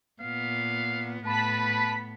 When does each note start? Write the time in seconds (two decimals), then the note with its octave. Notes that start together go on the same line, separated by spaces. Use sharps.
0.22 A#2 B3 F5
1.25 A2 B3 B4 A5 B5 B6